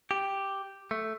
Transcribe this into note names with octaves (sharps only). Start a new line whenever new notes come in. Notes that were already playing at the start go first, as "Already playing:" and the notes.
G4
A3